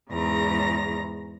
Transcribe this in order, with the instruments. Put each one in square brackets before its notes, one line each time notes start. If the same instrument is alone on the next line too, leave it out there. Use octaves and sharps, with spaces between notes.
[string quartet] E2 G#2 C#3 A#5 A#6